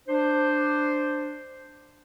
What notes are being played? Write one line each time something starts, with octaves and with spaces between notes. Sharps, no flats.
D4 C5